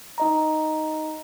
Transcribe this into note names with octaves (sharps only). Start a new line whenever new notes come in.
D#4 D#5 A#5